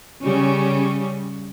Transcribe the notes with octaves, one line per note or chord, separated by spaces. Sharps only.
C#3 G3 C#4